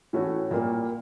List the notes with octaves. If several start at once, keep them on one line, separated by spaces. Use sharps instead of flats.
A2 E3 A3 C#4 F#4
A#2 G3 A#3